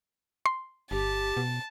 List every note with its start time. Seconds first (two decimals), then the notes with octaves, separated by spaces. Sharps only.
0.46 C6
0.91 G1 G4 A5
1.37 B2